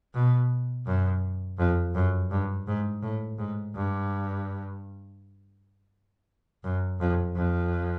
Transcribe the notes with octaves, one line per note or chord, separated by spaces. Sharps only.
B2
F#2
F2
F#2
G2
G#2
A2
G#2
G2
F#2
F2
F2